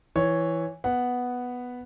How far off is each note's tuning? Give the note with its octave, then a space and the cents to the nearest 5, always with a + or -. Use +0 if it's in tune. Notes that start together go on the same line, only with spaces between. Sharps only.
E3 +0 C#5 +0
B3 +0 F#5 +0